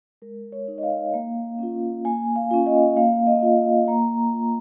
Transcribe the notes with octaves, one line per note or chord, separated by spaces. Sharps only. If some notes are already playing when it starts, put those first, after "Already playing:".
G#3 A#4
C#5
D#4
D#5
F5
A#3
C#4 F4
A#3 G#5
F5
C#4 F4
D#5
A#3 F5
D#5
F4
F5
A#3 A#5
F4